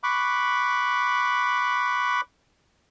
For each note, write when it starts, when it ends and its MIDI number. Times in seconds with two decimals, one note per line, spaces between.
0.03 2.21 83
0.03 2.21 85
0.03 2.21 86
0.03 2.21 90